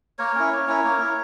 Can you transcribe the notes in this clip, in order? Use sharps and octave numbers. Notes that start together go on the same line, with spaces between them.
A#3 A#4 C#5
C#4 E4
A#3
C#4 E4
A#3
E4